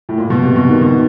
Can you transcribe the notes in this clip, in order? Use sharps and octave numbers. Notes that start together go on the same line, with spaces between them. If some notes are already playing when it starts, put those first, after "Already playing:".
A2
A#2
B2
C3
B2
D#3
B2